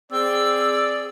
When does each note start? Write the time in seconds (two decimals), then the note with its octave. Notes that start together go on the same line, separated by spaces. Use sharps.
0.12 C4 G#4 D5 E6